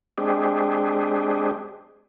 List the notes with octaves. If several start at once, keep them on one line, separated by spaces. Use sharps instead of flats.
G#3 C4 D4 G4 G#4